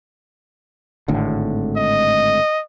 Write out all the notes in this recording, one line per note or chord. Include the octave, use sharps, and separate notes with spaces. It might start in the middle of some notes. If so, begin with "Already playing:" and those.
G#1 A2 D3
D#5